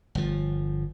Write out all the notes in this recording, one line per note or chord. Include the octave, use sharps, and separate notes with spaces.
G1 F3